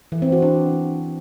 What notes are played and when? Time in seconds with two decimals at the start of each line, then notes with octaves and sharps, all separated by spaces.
0.12 E3
0.22 C4
0.32 F#4
0.42 D4